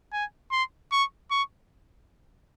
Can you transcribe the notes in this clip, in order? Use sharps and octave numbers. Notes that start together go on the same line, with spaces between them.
G#5
C6
C#6
C#6